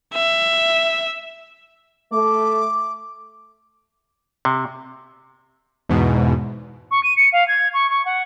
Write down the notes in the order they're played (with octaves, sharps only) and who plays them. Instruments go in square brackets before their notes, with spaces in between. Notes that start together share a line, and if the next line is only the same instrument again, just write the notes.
[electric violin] E5
[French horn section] A3 [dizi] D6
[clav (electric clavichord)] C3
[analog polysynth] E2 G#2 B2
[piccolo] C#6
D#7
C#7
F5
G#6
C#6
C#6
F#5